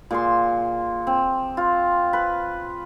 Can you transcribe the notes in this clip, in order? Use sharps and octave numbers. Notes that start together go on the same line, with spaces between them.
A#2 G#4 C6
C4
F4
B4